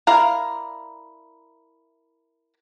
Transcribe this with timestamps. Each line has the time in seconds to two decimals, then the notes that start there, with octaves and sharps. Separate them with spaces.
0.07 E4 A#4 D5 F5